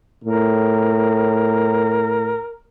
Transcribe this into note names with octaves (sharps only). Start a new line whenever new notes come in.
A2 A#4